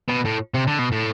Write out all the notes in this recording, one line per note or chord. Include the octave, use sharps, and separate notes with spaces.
B2
A2
C3
D3
B2
A2